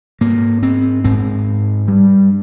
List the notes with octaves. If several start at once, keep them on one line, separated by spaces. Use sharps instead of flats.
G#2 A#3
C4
G#2 C4
G2 G3